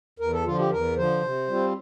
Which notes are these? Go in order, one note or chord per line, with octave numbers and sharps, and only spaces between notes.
E2 A#4
A4
D3 F3 F4
G4
E2 A#4
D3 F3 C5
C3
G3 C4 F4